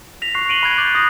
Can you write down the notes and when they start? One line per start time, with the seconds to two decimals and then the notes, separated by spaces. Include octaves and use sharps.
0.22 A#6 B6 F7
0.35 C#6 F#6 C7
0.48 C#6 C7 D7 D#7 F#7 G7
0.63 B5 F#6 G#6 D#7
0.78 D6 F#6 G6 A6
0.95 D#6 A#6